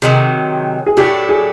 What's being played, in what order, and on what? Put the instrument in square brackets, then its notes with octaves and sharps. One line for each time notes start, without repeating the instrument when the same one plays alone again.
[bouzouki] C3 D#3 F#3 [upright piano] G#4
[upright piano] G#4
[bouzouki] A2 F#3 A3 D4 [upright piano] G4
[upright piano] G#4